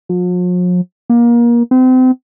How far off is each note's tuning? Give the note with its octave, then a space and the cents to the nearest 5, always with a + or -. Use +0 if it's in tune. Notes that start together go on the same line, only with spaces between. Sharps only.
F3 +45
A#3 +25
C4 -35